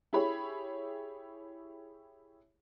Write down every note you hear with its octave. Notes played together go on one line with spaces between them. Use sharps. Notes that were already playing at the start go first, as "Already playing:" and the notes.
E4 G4 G#4 C#5 B5